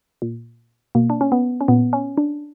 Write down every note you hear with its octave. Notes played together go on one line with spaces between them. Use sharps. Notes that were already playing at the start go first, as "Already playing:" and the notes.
A#2
B2 A#3
D4
C#4
B3
C#4
A#2 B3
C#4
D4